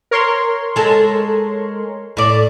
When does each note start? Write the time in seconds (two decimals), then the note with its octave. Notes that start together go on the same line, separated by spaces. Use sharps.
0.11 A#4 C#5 C6
0.76 G#3 A4
2.17 A2 D5